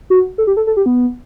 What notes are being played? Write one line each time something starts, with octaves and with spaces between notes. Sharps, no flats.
F#4
A4
G4
A4
A4
G4
B3